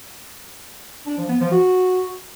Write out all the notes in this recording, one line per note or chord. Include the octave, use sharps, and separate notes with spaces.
D4
F3
B3
F3
F#4